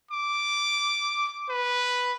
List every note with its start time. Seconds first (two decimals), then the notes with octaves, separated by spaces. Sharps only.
0.11 D6
1.49 B4